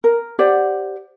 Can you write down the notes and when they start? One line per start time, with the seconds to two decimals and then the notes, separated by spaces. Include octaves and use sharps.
0.04 A#4
0.39 G4 C5 D5 F#5